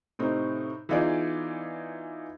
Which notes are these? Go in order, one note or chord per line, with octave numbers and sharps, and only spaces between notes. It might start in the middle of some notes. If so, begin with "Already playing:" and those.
A2 C3 C4 D#4
E3 B3 D#4 F4 G#4 D5